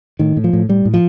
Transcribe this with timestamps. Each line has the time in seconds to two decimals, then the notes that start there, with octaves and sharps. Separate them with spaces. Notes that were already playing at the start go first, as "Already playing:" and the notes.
0.19 A2 D#3
0.37 A2
0.44 F3
0.53 A2
0.69 A2 G3
0.85 A2
0.94 F3